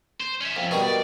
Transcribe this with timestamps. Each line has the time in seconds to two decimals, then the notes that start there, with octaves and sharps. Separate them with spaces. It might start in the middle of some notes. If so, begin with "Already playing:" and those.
0.21 C5
0.41 C#4 E5
0.56 F2
0.71 B2 D#3 G3 G#4
0.83 D5